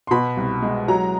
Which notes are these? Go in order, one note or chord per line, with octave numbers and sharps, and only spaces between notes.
C6
B2 B5
C2
G#3
F#3 A#5